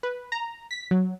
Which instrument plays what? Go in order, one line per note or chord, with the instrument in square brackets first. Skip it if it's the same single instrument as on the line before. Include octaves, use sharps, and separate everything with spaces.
[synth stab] B4
A#5
B6
F#3